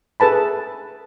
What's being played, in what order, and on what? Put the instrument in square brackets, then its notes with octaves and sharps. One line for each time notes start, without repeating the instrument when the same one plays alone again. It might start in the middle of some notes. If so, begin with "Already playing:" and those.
[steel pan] G#4 A4 B4 A5 B5